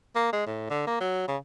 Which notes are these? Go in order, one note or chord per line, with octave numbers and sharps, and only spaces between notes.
A#3
G#3
A2
D3
A#3
F#3
C#3